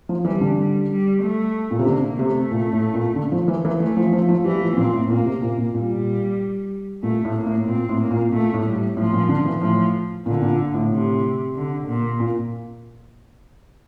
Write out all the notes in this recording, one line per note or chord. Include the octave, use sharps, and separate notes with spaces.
F3
E3 G3
D3
G3
G3
A3
A#2
C3
D3 A#3
C3 A3
A#2
A2
A#2
D3
F3
E3
E3
E3 A3
F3
F3
F3
E3 G3
F3
A#2 C4
A2
A#2 A#3
C3
A#2
A#2
A#2 G3
A#2 A3
A2
A#3
A2
A#2 C4
A2
A#3
A#2
A#2 A3
A2
G3
A2
A2 F3
A#2
D3
E3
A2 F3
A#2 D3
A#2
A2
C3
D3
A#2
A#2